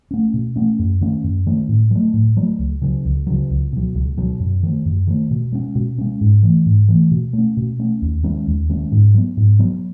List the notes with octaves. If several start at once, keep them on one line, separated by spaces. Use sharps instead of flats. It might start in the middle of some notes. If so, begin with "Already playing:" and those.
A3 C#4
B2
A3 C#4
F#2
D#3 A3 C#4
F#2
D#3 A3 C#4
A2
F#3 A3
A2
F#3 A3
C#2
C#3 F#3
C#2
C#3 F#3
C#2
B2 F#3
C#2
B2 F#3
F#2
D#3 A3
F#2
D#3 A3
B2
G#3 C#4
B2
G#3 C#4
G#2
E3 A3
G#2
E3 A3
B2
A3
C#4
B2
A3 C#4
D#2
D#3 G#3 C#4
D#2
D#3 G#3 C#4
G#2
F#3 B3
G#2
F#3 B3